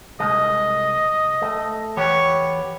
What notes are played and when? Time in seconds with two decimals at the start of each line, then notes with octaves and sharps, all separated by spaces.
0.20 C2 G#3 D#5
1.42 A3
1.97 E2 B3 G4 C#5